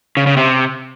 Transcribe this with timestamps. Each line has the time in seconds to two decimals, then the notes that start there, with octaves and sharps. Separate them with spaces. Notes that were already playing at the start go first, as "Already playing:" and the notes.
0.17 C#3
0.27 C#3
0.37 C3